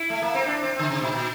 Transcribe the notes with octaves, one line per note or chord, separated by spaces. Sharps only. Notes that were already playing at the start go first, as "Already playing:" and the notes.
Already playing: E4
A3
A#3
C4
D4
C4
D3
C3
A#2
A#2